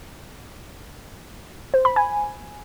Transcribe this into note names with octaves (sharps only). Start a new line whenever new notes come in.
C5
B5
G#5